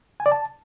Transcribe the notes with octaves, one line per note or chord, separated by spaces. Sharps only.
G#5
D5
A5